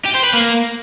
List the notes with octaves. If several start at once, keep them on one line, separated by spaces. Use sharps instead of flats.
G4
C5
B4
A#3